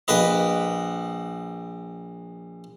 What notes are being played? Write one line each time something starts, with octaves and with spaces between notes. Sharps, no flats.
A#1 B4 D#5